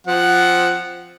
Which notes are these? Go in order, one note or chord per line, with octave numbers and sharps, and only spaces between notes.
F3 C4 F#5